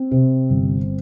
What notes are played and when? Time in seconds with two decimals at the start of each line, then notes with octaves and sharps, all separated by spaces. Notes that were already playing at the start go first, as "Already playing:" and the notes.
Already playing: C4
0.11 C3
0.50 G1